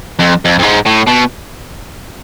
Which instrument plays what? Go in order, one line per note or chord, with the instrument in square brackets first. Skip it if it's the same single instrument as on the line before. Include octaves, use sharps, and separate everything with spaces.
[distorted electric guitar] F2
F2
F2
G#2
A2
B2